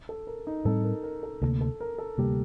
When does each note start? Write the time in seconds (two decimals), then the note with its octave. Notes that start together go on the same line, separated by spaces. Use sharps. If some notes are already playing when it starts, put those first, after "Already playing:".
0.09 A4
0.27 A#4
0.47 D#4
0.65 A2 G3 C4 A4
0.84 A#4
1.03 A#4
1.23 A4
1.42 D2 C3 G3 A#3 A4
1.61 A4
1.80 A#4
1.98 A4
2.18 D2 C3 G3 A#3 G4